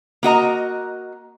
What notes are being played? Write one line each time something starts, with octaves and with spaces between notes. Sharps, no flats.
A#3 F#4 D#5 A#5